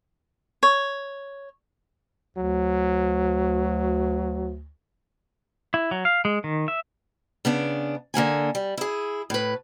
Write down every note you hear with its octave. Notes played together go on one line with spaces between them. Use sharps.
C#5
D2 F#3
E4
F#3
F5
G#3
D#3
E5
C#3 B3 D4
D3 A#3 F#5 G#5
G3
E4 G#4
A2 B4